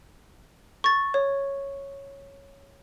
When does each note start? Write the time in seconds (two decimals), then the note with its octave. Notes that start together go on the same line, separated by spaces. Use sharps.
0.84 C#6 A6
1.14 C#5